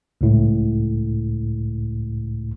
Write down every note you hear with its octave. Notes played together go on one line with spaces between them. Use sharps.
C#2 A2